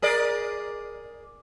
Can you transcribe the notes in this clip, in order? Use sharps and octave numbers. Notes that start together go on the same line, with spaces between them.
G#4 A#4 D5